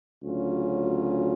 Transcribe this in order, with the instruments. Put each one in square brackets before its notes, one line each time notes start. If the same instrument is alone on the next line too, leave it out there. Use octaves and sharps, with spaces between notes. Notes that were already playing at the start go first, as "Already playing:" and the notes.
[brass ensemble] D2 C#3 F#3 C#4 F4